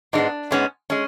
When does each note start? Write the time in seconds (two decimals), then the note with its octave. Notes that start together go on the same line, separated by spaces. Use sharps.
0.13 G#2 G#3 B3 D4
0.51 G#2 G#3 B3 C#4
0.90 G#3 C#4